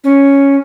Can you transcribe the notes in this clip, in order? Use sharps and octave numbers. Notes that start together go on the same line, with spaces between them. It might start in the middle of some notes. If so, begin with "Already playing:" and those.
C#4